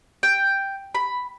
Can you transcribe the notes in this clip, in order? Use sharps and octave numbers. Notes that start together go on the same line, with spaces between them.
G5
B5